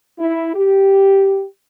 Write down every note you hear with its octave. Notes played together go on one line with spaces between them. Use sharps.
E4
G4